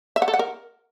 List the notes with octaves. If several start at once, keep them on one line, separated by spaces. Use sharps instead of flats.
E5
F#5
A4
F#5
A#4